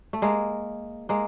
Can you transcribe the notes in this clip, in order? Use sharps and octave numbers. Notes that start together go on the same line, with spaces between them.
A3
G#3 A#3
G#3 A#3